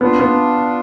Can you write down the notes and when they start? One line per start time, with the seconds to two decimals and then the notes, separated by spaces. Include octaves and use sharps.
0.01 B3 D4 F4
0.20 B3